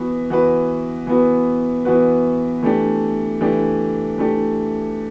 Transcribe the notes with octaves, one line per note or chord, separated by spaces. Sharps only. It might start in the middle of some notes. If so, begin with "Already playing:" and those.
Already playing: E3 B3 F#4 B4
E3 B3 F#4 B4
E3 B3 F#4 B4
E3 B3 F#4 B4
E3 A3 D4 G4
E3 A3 D4 G4
E3 A3 D4 G4